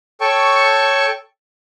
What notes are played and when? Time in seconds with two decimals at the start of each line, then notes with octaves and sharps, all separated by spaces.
0.21 A4 C#5 G5 A5 C#6